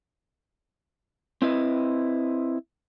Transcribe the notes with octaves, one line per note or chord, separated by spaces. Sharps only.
C4 E4 B4 D#5